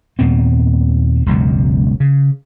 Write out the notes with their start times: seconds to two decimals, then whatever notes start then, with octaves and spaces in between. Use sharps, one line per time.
0.19 D#2 A#2 B3 C4
1.26 E1 C#2 F#2 F#3
2.00 C#3